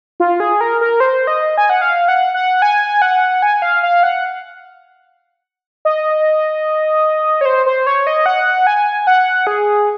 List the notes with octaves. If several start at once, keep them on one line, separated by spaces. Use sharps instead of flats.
F4
G#4
A#4
A#4
C5
D#5
G#5
F#5
F5
F#5
F#5
G#5
F#5
G#5
F5
F5
F#5
D#5
C#5
C5
C5
C#5
D#5
F#5
G#5
F#5
G#4